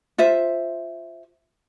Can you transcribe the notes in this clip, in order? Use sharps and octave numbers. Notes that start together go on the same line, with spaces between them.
F4 C5 E5